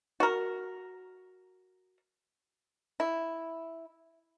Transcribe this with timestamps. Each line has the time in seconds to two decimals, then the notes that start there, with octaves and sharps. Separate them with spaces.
0.20 F#4 A#4
3.00 E4